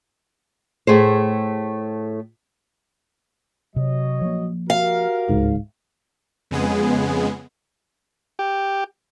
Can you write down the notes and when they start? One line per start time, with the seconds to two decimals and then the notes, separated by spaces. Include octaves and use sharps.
0.87 A2 A3 G#4 C5
3.76 C3 F#3 C#5 D#5
4.21 F3 A#3
4.70 F#4 G4 A#4 F5
5.29 D1 C#2 G#2
6.51 F2 C#3 G#3 B3 G#4
8.39 G4